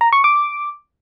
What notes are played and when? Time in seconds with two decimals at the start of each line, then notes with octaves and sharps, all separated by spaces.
0.01 A#5
0.13 C#6
0.24 D6